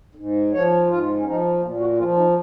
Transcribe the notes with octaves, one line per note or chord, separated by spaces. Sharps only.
G#2
F3 C#5
G#2 F4
C#4
F3 D#4
A#2 A#3
F#4
F3 F4
D#4